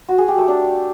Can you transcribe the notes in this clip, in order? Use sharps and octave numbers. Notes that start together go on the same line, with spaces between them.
F#4
G#4
G4
A3
D4